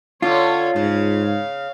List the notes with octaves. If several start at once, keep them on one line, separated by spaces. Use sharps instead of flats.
D3 C#4 F4 C#5
G#2 C#3 F5